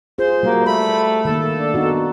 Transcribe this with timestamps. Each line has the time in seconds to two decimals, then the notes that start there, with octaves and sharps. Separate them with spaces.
0.18 F4 G#4 C5
0.43 G3 A#3 F4 F#4
0.66 A3 B5
1.25 D#3 A#3 A4
1.52 D4
1.74 B3 D#4 F#4